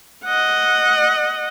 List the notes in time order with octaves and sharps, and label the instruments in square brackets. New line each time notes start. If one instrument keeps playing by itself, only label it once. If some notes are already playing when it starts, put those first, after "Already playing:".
[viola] D#5 F#5